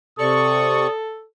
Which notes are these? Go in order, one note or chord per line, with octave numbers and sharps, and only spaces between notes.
C3 A4 D5 C#6 D#6